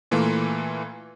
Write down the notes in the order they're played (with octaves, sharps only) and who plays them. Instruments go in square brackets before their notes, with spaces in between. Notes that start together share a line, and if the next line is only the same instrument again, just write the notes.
[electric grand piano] A#2 E3 A3 A#3 F4